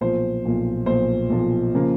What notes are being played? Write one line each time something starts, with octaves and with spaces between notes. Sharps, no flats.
B1 A#2 F3 C5
B1 A#2 F3
B1 A#2 F3 C5
B1 A#2 F3
C#3 F3 A#3